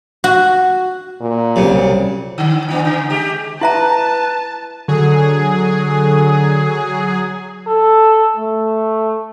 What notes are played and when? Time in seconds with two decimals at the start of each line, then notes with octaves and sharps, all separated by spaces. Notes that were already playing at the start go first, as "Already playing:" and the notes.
0.24 F#4
1.21 A#2
1.56 C2 C#3 F#3 G3 C4
2.38 D3
2.69 D#3 B3 D4
2.85 C#3
3.10 G#3 G4
3.61 E4 B4 E5 A5 A#5
4.88 D3 F#3 G#4
7.67 A4
8.37 A3